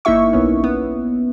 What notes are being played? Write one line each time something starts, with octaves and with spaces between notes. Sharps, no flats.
G1 A#3 D#4 E4 E5 C#6
B1 B3 C#4
B3